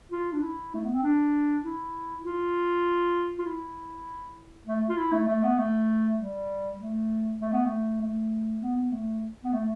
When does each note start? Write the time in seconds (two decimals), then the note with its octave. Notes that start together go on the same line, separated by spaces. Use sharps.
0.12 F4
0.33 D4
0.42 E4
0.74 A3
0.84 B3
0.93 C4
1.03 D4
1.64 E4
2.24 F4
3.39 F4
3.46 E4
4.67 A3
4.89 F4
4.97 E4
5.12 A3
5.28 A3
5.43 B3
5.58 A3
6.19 G3
6.80 A3
7.40 A3
7.53 B3
7.66 A3
8.01 A3
8.61 B3
8.77 B3
8.92 A3
9.44 B3
9.53 A3